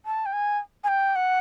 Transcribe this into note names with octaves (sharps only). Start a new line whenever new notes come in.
A5
G5
G#5
G#5
G5
F#5